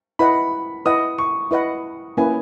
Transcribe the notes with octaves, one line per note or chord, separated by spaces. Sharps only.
E4 B4 D#5 F#5 B5
E4 B4 D#5 F#5 D#6
C#6
E4 B4 D#5 F#5
A#3 C#4 E4 B4 G#5